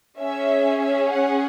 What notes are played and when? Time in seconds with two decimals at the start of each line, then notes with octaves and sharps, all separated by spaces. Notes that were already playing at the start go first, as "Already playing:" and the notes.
0.19 C#4 G#4 E5
0.80 E5
1.10 F#5